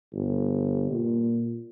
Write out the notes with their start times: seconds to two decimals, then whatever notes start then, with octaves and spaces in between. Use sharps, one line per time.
0.13 G1
0.90 A#2